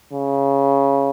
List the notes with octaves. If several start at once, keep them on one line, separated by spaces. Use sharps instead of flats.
C#3